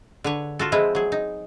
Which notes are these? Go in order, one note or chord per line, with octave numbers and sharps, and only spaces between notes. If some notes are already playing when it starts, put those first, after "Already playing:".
D3 B4 C#5
F4 F#4 A4
F3 G#3 C4 E4 B4
F#3 G#4
D#4